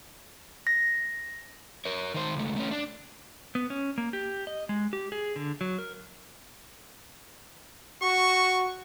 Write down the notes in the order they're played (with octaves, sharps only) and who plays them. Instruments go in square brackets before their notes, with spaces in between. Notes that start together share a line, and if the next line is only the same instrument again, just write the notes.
[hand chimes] A#6
[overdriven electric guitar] A#4 C#5
D#3 C5
C#2 A3
A3 C#4
D4
[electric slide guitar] B3
C#4
A#3
G4
D#5
G#3
G4
G#4
D3
F#3
A#4
[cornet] F#4 [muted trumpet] C#6